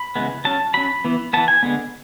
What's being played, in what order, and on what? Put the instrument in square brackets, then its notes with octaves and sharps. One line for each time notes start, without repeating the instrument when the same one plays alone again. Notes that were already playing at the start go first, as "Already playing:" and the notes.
Already playing: [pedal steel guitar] B5
C#3 E3 G#3 B3
F#3 C#4 A5
F#3 C#4 B5
E3 B3
E3 B3 A5
G#5
D3 G#3 B3